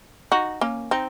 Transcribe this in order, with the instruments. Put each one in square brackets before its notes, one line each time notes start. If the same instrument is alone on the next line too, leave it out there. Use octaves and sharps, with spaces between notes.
[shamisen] D#4 F#4
A#3 C#4
C4 D#4